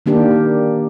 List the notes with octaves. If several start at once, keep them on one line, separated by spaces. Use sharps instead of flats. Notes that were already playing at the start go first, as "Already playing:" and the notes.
D#3 A#3 D4 G4